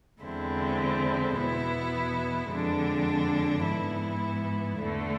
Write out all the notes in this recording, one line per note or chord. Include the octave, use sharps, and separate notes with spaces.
E2 D3 G#3 C4 E4
E2 B2 B3 E4
F2 D3 G#3 D4
G#2 E3 B3 E4
E2 D3 A3